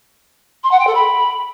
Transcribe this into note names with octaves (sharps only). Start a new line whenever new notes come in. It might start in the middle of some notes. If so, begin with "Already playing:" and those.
C6
F#5
G5
A4
B5